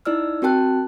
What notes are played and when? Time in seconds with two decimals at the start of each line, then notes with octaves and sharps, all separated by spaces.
0.05 D#4 E4 D5 E6 F6
0.42 C4 F#4 A#4 G5 A5 F#6